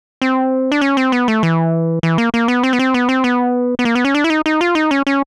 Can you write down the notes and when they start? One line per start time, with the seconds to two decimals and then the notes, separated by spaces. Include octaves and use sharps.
0.22 C4
0.72 D4
0.81 C#4
0.97 C4
1.12 B3
1.28 A3
1.43 E3
2.03 E3
2.18 A#3
2.34 A#3
2.48 B3
2.63 C4
2.73 B3
2.79 C4
2.94 B3
3.09 C4
3.24 B3
3.79 B3
3.85 A#3
3.95 B3
4.05 C#4
4.15 D4
4.24 E4
4.30 D#4
4.46 D#4
4.61 F4
4.75 D#4
4.91 C#4
5.07 C#4